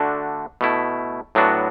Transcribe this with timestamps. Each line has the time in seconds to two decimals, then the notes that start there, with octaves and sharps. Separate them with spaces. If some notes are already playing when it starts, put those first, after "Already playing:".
Already playing: D3 A3 D4 F#4
0.61 B2 A3 E4
1.35 A2 F#3 B3 D4 F#4